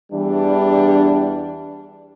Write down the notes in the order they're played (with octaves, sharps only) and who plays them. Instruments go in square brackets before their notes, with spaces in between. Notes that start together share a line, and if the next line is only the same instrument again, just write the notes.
[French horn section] E2 E3 G3 D4